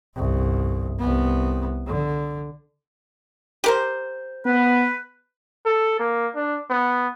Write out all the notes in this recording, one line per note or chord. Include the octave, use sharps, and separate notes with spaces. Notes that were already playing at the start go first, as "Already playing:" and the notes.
G1 C2
C2 B3
D3
G4 A#4 C5
B3 B4
A4
A#3
D4
B3